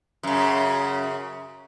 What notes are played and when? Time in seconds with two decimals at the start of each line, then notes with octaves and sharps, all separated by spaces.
0.23 F#2 C#3